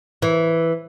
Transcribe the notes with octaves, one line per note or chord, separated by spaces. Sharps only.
E3